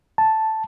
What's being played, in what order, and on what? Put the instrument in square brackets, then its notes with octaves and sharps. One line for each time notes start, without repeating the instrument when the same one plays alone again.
[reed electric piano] A5